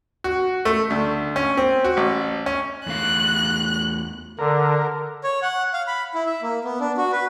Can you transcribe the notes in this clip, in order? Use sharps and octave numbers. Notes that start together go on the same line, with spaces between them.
F#4
A3
D2
C#4
C4
F#4
A1
C#4
E2 A3 F5 F#6
D3 A#4
C#5
F#5
F5
B5
E4
E5
A#3
B3
D4
F#4
B4